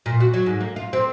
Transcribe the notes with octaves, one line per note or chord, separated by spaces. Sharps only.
A#2
F#4
F#3
G#2
A#3
F4
C4